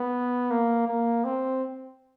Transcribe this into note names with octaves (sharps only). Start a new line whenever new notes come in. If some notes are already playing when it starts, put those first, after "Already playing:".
Already playing: B3
A#3
A#3
C4